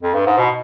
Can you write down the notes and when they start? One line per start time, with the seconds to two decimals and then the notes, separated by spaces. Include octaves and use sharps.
0.03 F2
0.14 G2
0.26 G#2
0.38 B2